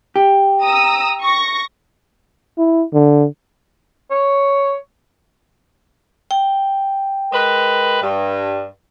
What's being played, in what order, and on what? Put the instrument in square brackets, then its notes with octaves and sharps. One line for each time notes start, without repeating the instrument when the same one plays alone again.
[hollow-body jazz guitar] G4
[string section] A#5 D#6 E6
C#6 A#6
[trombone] E4
D3
[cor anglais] C#5
[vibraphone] G5
[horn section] G#3 A#4 B4
G2